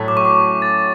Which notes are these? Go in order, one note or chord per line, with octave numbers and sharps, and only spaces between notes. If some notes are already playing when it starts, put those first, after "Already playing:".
Already playing: A2 F#3 A3 C#4
D6
C#6
D6
A6